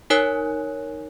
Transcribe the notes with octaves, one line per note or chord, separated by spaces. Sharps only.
D#4 A#4 C#5 G#5 F#6